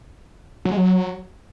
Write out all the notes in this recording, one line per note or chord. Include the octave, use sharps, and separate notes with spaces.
F#3
G#3
F#3